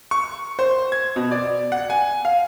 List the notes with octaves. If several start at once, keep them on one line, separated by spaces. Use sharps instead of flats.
C#6
C5
G#6
B2
D5
F#5
G#5
F5